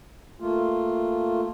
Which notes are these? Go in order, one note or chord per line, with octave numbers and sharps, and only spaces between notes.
A3 A#3 F4